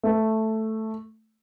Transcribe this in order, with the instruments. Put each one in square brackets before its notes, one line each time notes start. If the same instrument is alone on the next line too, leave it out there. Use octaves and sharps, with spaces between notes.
[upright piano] A3